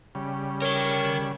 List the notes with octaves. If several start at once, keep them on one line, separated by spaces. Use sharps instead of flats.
C#3 G3
A#4 C#5 G5